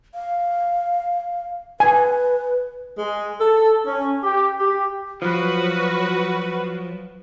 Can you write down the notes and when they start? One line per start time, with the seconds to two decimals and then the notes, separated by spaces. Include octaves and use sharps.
0.15 F5
1.80 B4 G#5
2.99 G#3
3.41 A4
3.87 C#4
4.23 G4
4.60 G4
5.22 F3 F#3 F#4 B4